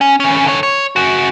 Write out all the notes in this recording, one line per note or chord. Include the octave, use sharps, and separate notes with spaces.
C#4
E3 C#4
D3 C#5
C#5
C#3 F#4